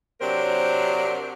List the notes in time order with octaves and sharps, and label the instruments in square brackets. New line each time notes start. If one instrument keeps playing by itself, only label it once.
[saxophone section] C3 F#3 D4 A#4 C5